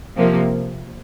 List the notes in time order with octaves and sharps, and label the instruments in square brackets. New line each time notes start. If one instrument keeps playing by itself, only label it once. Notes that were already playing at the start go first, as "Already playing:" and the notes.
[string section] C3 F3 A#3